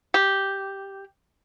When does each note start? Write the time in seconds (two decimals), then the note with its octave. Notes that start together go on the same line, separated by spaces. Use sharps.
0.14 G4